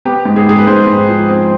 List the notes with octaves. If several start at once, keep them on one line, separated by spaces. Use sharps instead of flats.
B3 G4
G#2
G#4
G#2 G#4
B4
G#2 C5
G#2
F3
C4